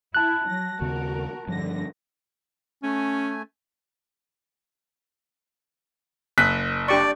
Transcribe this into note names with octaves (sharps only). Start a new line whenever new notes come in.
E4 A5 F#6
F#3 A#6
D#2 C#3 B3 F#4 A#4
G2 D3 F3 A#6
A3 C#4 G#5
F#1 F#6 B6
D4 G4 D5 C#6